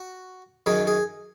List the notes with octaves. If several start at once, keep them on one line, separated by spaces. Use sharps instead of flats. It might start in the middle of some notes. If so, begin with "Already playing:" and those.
Already playing: F#4
F#2 D#3 F#3 G#4
G#4